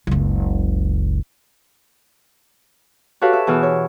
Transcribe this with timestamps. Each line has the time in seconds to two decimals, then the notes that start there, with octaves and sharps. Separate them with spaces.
0.07 F#1 C#2
3.21 F#4 G4 A4 B4 C#5 F5
3.33 E5
3.47 B2 E3 G#4 E6 F6
3.63 C#5